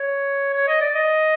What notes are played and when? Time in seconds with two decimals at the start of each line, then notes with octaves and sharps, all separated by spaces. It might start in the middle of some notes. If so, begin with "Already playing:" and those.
Already playing: C#5
0.53 C#5
0.67 D#5
0.81 D5
0.95 D#5